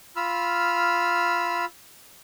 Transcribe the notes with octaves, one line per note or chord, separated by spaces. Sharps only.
F4 B5 E6 F6